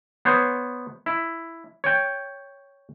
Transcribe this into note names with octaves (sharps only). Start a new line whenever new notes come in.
B3 C5 C#5
E4
C#5 G5